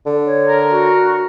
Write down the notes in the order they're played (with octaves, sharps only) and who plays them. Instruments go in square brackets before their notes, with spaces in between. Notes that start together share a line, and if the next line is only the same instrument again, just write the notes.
[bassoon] D3
[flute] C#5
[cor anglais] A#4
[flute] F#4